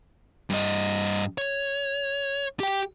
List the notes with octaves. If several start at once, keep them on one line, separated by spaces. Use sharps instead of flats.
G2 D#5
C#5
G4 G5